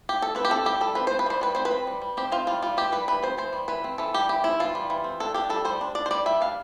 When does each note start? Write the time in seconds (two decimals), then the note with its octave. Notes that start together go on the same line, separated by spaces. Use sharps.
0.09 G4
0.22 A4
0.35 C4 B4
0.45 G4
0.50 C4 A4
0.65 G3 G4
0.81 G3 A4
0.95 C4 B4
1.07 C4 C5
1.19 B4
1.26 G3 C5
1.41 G3 B4
1.55 C4 C5
1.65 B4
1.71 C4
1.87 G3
2.02 G3
2.17 C4 G4
2.32 C4 F4
2.47 G3 F4
2.62 G3 F4
2.77 E3 G4
2.92 G3 B4
3.08 E3 B4
3.22 C4 C5
3.38 E3 C5
3.53 G3
3.68 E3 B4
3.84 C4
3.98 E3 A4
4.14 G3 G4
4.29 E3 G4
4.44 C4 E4
4.60 E3 F4
4.75 G3
4.90 E3
5.04 C4
5.20 D4 A4
5.34 D4 G4
5.49 G3 A4
5.65 G3 C5
5.81 D4
5.95 D4 D5
6.06 C5
6.11 G3 D5
6.26 G3 E5
6.41 D4 F5